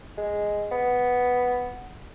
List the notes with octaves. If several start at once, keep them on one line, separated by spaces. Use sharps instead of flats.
G#3
B3